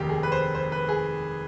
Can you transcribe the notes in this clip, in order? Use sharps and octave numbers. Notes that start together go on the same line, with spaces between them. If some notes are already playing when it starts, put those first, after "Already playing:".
Already playing: F1 D#2 D#3 G4
G#4
B4
C5
C5
B4
G#4